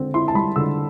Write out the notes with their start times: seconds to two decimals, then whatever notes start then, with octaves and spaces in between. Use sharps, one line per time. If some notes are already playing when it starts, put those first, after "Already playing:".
Already playing: D3 C4
0.14 E4 C6
0.28 A5
0.35 G3 B5
0.56 D3 E6